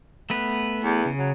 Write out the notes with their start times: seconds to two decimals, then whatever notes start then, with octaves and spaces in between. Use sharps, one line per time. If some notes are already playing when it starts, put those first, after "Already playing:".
0.30 A3 B3 B4
0.84 E2
1.05 C#3
1.19 F#3